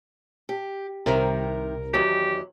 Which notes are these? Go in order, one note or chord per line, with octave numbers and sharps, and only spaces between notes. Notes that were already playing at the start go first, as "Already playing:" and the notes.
G4
C2 C3 D#3 A#4
E2 D#3 F#3 G4